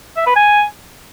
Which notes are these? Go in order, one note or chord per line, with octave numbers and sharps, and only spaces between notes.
E5
B4
G#5